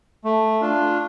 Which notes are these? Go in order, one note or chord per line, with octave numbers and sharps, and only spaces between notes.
A3
D4 F4